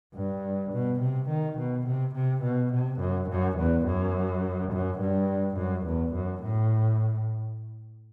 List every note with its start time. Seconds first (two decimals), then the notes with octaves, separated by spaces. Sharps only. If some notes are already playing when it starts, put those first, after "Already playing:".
0.15 G2
0.73 B2
1.01 C3
1.30 D#3
1.59 B2
1.87 C3
2.15 C3
2.44 B2
2.73 C3
3.01 F#2
3.30 F#2
3.58 E2
3.87 F#2
4.72 F#2
5.00 G2
5.58 F#2
5.87 E2
6.15 F#2
6.43 A2